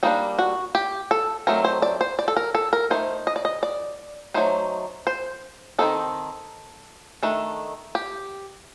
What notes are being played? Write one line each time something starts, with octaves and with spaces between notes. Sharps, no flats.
G3 A#3 D4 D#4
F#4
G4
A4
F#3 A3 C4 D#4 A#4
C5
D5
C5
D5
A4
A#4
A4
A#4
A3 C4 D#4 C5
D#5
D5
D#5
D5
F#3 A3 D#4 C5
C5
D#3 G3 C4 D#4 A4
D#3 A3 D4
G4